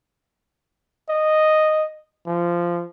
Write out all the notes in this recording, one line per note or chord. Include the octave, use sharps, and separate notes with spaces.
D#5
F3